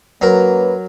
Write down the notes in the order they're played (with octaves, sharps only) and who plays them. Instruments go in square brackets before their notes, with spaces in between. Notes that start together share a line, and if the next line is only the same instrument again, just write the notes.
[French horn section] F#2 A#3 B4 [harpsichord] F#3 A#4